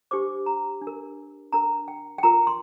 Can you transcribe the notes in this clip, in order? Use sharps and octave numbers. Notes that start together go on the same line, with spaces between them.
D4 G4 C5 D6
A#5
D4
A#4
D4 A#4 A#5
G5
G5
F4 A#4 A#5
C6